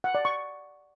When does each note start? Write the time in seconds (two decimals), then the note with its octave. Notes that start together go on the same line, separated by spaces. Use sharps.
0.04 F#5
0.15 D5
0.25 C#6